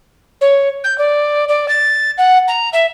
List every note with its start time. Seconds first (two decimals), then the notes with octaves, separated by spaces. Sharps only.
0.41 C#5
0.84 G6
0.98 D5
1.48 D5
1.68 A6
2.18 F#5
2.48 A#5
2.73 E5